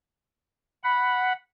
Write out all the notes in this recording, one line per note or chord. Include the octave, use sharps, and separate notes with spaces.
F#5 B5